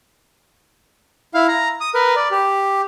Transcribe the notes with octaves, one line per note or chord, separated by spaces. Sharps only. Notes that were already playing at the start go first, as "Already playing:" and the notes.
E4 F5
A#5
D#6
A#4 B4
D5
G4